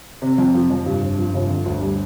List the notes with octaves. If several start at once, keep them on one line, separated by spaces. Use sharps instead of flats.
C3
F2
F3
F2
G2
G1
F3
G1
D3
D2
G3